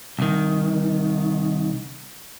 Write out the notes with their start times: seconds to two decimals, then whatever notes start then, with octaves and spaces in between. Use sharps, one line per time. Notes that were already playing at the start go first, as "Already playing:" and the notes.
0.19 C2 D#3